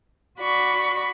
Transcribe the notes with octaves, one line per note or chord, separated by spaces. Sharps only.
F#4 D5 B5 C#6